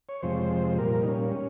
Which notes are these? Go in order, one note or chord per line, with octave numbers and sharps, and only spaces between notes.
C#5
F2 C3 F3 G#3 C5
A#2 G3 A#4
D#4
C#4